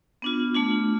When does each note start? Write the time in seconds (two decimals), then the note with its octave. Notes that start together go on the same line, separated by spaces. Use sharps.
0.22 B3 D4 F4
0.54 A3 D4 F4